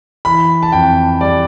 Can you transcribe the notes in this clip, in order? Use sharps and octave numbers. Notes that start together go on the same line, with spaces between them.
E3 B5
A5
F2 G5
G3 D5